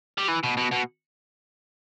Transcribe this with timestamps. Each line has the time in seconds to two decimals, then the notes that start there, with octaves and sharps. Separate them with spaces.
0.18 G3
0.28 E3
0.44 B2
0.57 B2
0.72 B2